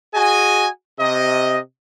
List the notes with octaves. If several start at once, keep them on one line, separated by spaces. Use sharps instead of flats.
F#4 G#4 D#5 G#5
C3 D#5